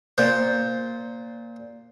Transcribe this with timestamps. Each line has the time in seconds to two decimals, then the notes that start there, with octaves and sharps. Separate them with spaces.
0.18 A#2 C5